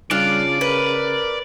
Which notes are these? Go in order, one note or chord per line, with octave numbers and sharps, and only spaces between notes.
C#3 G3 D4 F4 D5
A#4 B4